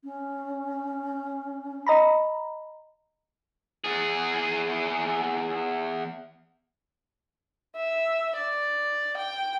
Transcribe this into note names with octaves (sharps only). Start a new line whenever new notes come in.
C#4
D#5 A#5 B5
E2 G#4
E5
D5
G5